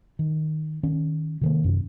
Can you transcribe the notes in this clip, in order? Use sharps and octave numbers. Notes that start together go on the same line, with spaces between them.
D#3
D#3 C#4
C3 D#3 A#3
F#2 C3